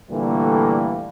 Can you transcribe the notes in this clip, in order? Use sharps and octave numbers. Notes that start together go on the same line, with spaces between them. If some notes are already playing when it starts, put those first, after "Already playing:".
A#2 D3 E3 G3 A3 A#3